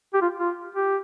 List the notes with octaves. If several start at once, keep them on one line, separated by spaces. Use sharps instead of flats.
G4
F4
F4
G4